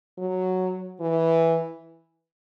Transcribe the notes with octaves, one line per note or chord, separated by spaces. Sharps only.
F#3
E3